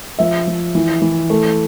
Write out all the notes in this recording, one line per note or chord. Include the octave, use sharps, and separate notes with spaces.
F3 E5
F3
E3
E3
A3